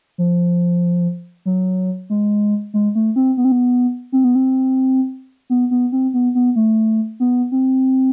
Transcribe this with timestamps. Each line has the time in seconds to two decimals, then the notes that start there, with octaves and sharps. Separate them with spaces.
0.18 F3
1.46 F#3
2.10 G#3
2.74 G#3
2.95 A3
3.16 C4
3.37 B3
3.45 C4
3.52 B3
4.12 C4
4.24 B3
4.35 C4
5.50 B3
5.71 B3
5.92 C4
6.14 B3
6.35 B3
6.56 A3
7.20 B3
7.52 C4